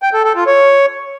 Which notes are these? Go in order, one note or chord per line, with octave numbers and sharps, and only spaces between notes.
G5
A4
A4
F4
C#5